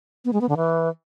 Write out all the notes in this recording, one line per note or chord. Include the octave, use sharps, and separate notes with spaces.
B3
G#3
B3
D3
E3